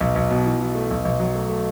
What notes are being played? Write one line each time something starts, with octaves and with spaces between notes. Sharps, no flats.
B1
B1
B2
E3
E3
A3
B1
B1
F#3
A3
A3